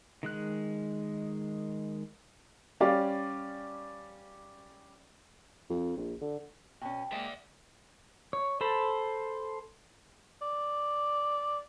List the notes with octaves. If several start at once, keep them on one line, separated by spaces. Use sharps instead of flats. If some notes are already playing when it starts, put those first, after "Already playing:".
D#3 G#3 F#6
G3 C#4 G4 D5 F5
F2
A#1
D3
B2 C#4 G5
G#3 A#3 D5 E5
C#5
A4 C5 A5 B5
D5